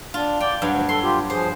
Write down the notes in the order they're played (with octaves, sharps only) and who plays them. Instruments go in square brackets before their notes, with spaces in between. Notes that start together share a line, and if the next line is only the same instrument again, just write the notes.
[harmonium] D4 [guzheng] F4
[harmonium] D5 [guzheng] G5
[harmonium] D2 [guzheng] G2 F#3
[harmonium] A4 [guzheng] C6
[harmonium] F4 G4
[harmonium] F3 G#4 [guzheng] C5